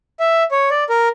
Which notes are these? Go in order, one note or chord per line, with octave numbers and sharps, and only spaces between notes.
E5
C#5
D5
A#4